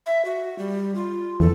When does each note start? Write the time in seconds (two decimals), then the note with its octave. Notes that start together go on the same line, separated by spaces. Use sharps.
0.06 E5
0.25 F#4
0.59 G3
0.95 F4
1.40 E2 A4